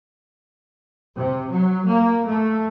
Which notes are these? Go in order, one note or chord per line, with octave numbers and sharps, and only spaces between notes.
C3
F#3
A#3
A3